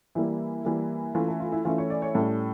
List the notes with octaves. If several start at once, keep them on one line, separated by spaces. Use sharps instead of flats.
E3 G3 A#3 E4
E3 G3 A#3
E3 A3 C#4 F4
A4
F4
E4
E3 A3 C#4 F4
C#5
D5
C#5
A2 G3 C#4 A4